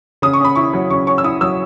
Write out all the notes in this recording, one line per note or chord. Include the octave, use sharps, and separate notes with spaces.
C#3 D#6
C#6
C#4 B5
E4 C#6
F#3
C#3 C#6
C#4 C#6
E6
E4 D#6
F#3 E6